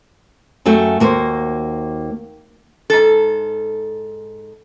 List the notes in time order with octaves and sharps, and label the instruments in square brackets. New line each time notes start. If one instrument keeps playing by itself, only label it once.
[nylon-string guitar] F#2 A3 F#4 G5
D#2 A#3 F#4 C5
[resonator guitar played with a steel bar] G#2 A4